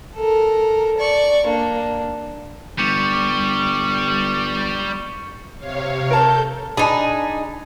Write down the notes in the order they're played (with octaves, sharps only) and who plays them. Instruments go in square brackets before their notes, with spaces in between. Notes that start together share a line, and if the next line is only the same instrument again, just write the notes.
[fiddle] A4 A#4
D5 C#6
A#3 D4
[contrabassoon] G1 [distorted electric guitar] G3 [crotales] C#6 C#7 D#7
[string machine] C3 C#5 F5
[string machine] A4 G6 [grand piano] A#4 A5
[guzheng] D4 [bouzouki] D#4 G#4 [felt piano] A5 B5